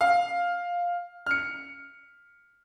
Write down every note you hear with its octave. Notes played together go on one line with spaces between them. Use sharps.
F5
F6 C#7